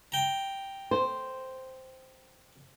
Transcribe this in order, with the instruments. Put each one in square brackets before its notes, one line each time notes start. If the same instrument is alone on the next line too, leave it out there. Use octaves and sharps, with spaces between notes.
[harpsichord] G5 A#5
[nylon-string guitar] C5